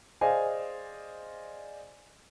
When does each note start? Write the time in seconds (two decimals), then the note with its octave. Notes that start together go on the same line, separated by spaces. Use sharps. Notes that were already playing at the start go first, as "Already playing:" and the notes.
0.21 G#4 C5 D5 D#5 F5 G#5